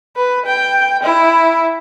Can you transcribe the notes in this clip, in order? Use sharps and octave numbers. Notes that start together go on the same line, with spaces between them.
B4
G5
E4